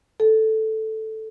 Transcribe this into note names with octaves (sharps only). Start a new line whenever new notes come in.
A4